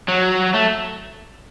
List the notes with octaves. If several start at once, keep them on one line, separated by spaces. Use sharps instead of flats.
F#3
A3